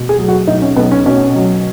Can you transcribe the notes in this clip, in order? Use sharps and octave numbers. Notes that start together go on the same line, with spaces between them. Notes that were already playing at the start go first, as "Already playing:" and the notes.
Already playing: B2
G#4
F#3
F#4
B1 D#4
C#4
B1 B3
C#4
B2 C#4
F#3